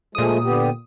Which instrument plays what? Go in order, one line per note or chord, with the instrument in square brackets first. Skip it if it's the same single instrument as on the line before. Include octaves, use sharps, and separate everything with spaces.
[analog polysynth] A#2 D#6 [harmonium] F3 G#3 A3
[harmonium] D3 B3 G4